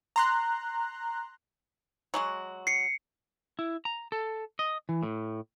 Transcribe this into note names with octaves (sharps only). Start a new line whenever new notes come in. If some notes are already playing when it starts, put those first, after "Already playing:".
A#5 C6 F#6
F#3 G#3 F#4
C7 C#7
E4
A#5
A4
D#5
E3
A2